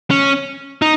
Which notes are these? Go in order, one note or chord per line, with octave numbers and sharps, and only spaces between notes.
C#4
D#4